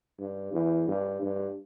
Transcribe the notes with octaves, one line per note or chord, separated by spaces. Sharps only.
G2
E2
G2
G2